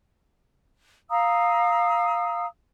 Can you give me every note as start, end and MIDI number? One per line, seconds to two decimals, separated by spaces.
1.09 2.46 77
1.09 2.46 82
1.09 2.46 87
1.09 2.46 88